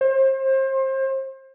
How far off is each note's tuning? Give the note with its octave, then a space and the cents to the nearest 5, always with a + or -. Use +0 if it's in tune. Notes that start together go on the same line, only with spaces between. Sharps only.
C5 +30